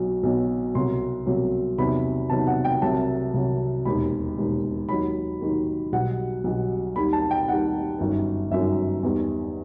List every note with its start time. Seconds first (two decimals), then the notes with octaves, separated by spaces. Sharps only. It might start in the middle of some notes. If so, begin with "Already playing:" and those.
Already playing: B1 B2 F#3
0.23 B1 B2 F#3
0.75 C2 B2 F#3 C6
1.26 C2 B2 F#3
1.78 E2 C3 D#3 F#3 B5
2.30 E2 C3 D#3 F#3 A5
2.47 F#5
2.65 G5
2.81 C2 C3 F#3 A5
3.34 C2 C3 F#3
3.85 E1 D#2 D#3 B5
4.37 E1 D#2 D#3
4.89 D#2 D#3 F#3 B5
5.41 D#2 D#3 F#3
5.92 B1 B2 G3 F#5
6.44 B1 B2 G3
6.96 D#2 D#3 G3 B5
7.13 A5
7.31 G5
7.48 D#2 D#3 G3 F#5
7.99 G1 F#2 D#3
8.51 G1 F#2 D#3 E5
9.03 E2 D#3 G3